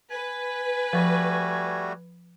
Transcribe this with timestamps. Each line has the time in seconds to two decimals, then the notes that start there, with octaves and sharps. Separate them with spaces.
0.11 B4 G#5
0.93 F3 G3 A3 F#4